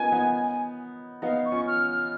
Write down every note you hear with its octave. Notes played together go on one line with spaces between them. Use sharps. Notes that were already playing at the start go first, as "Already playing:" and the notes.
Already playing: B3 C#4 D#4 F4 A#4 C#5 G#5
B3 D#4
B3 D#4 F5
C#6
C#4 F4
F6
F6